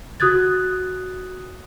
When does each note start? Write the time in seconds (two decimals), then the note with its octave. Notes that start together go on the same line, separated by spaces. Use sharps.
0.20 F#4 D#6 F#6 G#6 A6